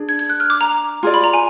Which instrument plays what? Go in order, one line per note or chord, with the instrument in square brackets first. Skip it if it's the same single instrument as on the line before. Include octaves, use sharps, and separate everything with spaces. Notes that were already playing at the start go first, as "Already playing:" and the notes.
Already playing: [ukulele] D4 G#4
[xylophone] G#6
G#6
F#6
F6
D6
A#5
[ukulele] F4 G#4 D5
[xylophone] B5
A#5
G#5